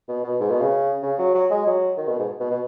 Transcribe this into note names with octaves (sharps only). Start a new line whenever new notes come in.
B2
B2
G#2
B2
C#3
C#3
F#3
F#3
G#3
F#3
D#3
B2
G#2
B2
B2